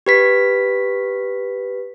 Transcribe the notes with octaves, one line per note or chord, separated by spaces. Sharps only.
G4 B4 B6